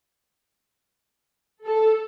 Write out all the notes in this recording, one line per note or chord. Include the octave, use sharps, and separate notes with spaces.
A4